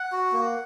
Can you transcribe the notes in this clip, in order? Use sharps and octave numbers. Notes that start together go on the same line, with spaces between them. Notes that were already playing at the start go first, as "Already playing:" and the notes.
Already playing: F#5
F#4
A#3